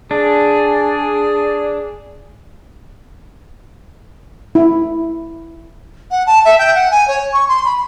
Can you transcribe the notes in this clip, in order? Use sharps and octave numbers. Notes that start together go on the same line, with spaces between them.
D4 G#4
E4
F#5
A5
E5
G5
F#5
G#5
C#5
C#6
C6
B5